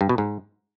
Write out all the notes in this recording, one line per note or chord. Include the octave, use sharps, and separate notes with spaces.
G2
B2
G#2